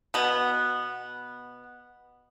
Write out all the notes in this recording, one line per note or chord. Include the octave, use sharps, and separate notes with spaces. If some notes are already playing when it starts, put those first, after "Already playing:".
B2 B3